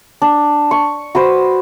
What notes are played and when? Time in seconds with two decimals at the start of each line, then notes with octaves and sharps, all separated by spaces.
0.22 D4
0.71 C#6
1.15 F#4 B4 C5 B5